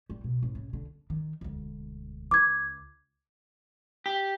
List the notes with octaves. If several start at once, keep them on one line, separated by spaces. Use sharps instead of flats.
G3
B2
A1
C#3
D3
D#3
E1 D2
C#2 D6 G#6
G4